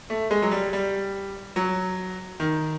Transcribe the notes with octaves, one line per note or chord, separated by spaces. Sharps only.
A3
G#3
F#3
G3
G3
F#3
D#3